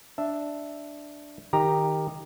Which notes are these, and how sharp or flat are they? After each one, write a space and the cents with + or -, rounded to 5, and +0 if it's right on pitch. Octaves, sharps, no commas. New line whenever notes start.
D4 +0 E5 +0
D#3 +0 G4 +10 A#5 +0